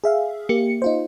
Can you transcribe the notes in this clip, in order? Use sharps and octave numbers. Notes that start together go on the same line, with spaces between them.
G#4 E5 F5
A#3 G4 C#7
D#4 F4 C5